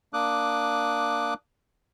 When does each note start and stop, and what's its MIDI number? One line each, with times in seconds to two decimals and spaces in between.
0.13 1.34 58
0.13 1.34 62
0.13 1.34 86
0.13 1.34 87
0.13 1.34 90